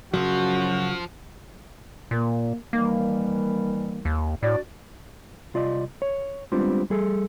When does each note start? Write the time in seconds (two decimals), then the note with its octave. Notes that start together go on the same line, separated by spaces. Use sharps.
0.14 F#2 C#3 F3 F#3 F#4
2.11 A#2 A#3
2.73 D#3 E3 G3 A#3
4.05 D#2
4.43 A2 D4 F#4 D5
5.54 C2 F4 D5 D#5
6.02 C#5
6.52 G3 G#3 B3 C4 D4 F4
6.90 G3 G#4 A4